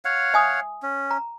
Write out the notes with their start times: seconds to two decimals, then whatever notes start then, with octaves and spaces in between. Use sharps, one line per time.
0.05 C#5 F5 F#5
0.34 E5 G#5 D#6
0.83 C#4
1.11 A#5